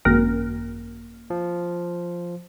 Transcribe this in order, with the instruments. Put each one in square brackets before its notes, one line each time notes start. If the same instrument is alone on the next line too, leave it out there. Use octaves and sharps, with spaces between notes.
[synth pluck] G#1 F#2 A#4 [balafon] A#3
[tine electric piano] F3